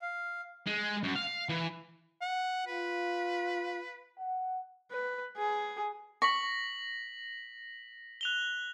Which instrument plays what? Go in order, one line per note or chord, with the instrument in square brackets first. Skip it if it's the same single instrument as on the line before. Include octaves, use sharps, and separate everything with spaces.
[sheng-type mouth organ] F5
[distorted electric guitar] G#3
F#2
F5
E3
[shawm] F#5
[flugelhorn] F4 [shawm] B4
[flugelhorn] F#5
[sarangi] B4
G#4
[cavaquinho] C#6 [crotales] A#6 B6 F#7
[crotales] F#6 F7 G7